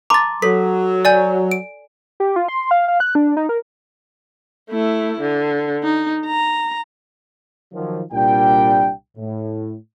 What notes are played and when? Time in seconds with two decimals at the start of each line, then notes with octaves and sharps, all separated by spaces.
0.10 A5 A#5 C6 D6 A6
0.42 F#3 A4 C#5 B6
1.05 D5 G#5 G6
1.51 D7
2.20 G4
2.36 F4
2.48 C6
2.71 F5
2.88 F5
3.00 F#6
3.15 D4
3.37 D#4
3.49 A#4
4.70 A3 E4
5.20 D3
5.84 D#4
6.27 A#5
7.73 D#3 F3 F#3
8.12 C2 A#2 G3 D4 G5
9.17 A2